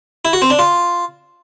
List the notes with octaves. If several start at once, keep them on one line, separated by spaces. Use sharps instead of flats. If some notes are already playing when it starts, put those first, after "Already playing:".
E4
F#4
C4
D4
F4